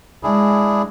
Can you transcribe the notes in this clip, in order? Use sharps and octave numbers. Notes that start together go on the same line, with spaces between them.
G#3 D4 E4 G#4